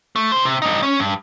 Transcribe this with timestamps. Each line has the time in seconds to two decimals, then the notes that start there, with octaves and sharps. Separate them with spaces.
0.16 A3
0.32 C3 C5
0.45 C3
0.62 G2 D#4
0.83 C#4
1.00 G2